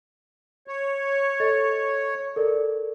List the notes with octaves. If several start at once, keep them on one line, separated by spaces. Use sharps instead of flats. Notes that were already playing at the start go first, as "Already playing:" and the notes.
C#5
A4 D#5 A6
A4 A#4 D5